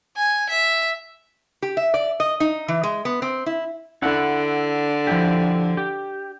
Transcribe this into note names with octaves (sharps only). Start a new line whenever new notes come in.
G#5
E5
G4
E5
D5
D#5
D#4
E3
G#3
B3
C4
E4
D3 E4 F#5
F3 E4 G4
G4